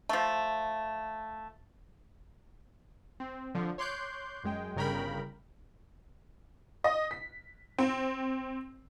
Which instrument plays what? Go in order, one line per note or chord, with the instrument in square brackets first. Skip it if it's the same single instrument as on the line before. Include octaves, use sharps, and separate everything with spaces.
[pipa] F3 A3
[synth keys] C4
D3 F3
C#5 C6 D6 F#6 G6
F#2 G#3 G5
G1 C#3 A#4 G5 B5
[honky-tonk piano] D#5
B6
C4